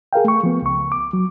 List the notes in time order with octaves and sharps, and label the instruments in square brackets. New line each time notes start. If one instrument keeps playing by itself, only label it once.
[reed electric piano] G#4 A#4 F5 G5
A3 C#6
F3 B3
C#2 C#6
D6
F#3